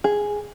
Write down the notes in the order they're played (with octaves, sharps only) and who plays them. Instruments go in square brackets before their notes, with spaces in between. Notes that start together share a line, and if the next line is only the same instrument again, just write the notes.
[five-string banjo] G#4